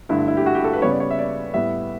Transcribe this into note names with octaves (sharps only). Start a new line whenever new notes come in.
G2 D3 A3 E4
E4
G4
F#4
G4
A4
B4
C#3 G3 B3 C#5
D5
C#5
E5
D5
A2 G3 B3 E5